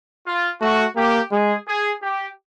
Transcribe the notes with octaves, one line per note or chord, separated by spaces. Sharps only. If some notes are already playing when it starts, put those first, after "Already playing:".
F4
A3 F#4
A#3 G4
G#3 G#4
G#4
G4